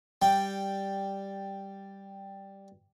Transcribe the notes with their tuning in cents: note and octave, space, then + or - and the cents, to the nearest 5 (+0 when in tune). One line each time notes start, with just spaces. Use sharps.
G3 +0 G5 +0